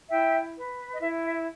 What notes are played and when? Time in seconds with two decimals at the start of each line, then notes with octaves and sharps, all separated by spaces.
0.10 E4 E5 G5
0.56 B4
0.94 D#5
1.01 E4 E5
1.24 E5